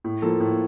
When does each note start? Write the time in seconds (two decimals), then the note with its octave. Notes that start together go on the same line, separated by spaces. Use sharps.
0.04 A2
0.22 F3 A#3 F4 A4
0.40 A2